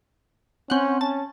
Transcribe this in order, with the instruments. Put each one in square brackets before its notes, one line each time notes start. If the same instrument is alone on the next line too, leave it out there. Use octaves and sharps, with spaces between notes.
[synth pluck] C4 F#5 [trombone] C#4
[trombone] C#4 [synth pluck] A5